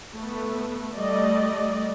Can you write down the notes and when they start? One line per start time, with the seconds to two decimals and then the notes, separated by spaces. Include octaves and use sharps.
0.14 A3 B3
0.94 G3 A3 D5 D#5